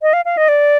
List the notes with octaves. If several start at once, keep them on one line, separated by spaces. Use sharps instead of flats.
D#5
F5
F5
D#5
D5